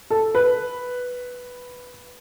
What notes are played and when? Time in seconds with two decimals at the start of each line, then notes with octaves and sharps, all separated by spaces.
0.11 A4
0.35 B4